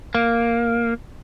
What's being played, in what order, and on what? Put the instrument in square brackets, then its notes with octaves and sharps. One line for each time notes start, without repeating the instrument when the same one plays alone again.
[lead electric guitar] A#3